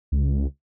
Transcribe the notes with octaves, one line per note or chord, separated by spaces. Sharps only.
C#2